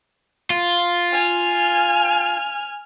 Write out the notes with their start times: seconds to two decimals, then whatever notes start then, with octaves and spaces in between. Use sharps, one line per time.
0.50 F4
1.12 G#5 F6